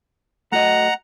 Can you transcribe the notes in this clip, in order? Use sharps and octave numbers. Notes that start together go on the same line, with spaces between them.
A3 F#4 D#5 F#5 A#5